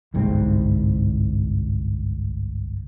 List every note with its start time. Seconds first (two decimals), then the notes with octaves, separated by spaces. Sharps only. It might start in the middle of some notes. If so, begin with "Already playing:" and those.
0.14 G1 C2 G#2 C4